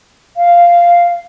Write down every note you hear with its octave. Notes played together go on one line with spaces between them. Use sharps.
F5